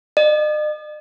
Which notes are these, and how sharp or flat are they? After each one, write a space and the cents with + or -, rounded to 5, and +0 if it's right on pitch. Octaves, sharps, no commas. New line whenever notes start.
D#5 -45